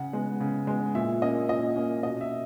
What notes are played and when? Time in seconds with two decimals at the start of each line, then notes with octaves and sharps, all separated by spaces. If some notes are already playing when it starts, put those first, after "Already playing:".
Already playing: C#3 F#5
0.13 G#3 B3
0.40 C#3
0.67 G#3 B3
0.95 A#2 E5
1.22 A#3 C#4 D#5
1.49 A#2 D#5
1.76 A#3 C#4
2.03 B2 D#5
2.21 E5